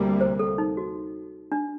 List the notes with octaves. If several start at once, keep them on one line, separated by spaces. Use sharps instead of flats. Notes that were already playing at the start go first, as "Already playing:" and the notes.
Already playing: D2 C3 G3 A#3
C5
A4
D#4
F#4
D4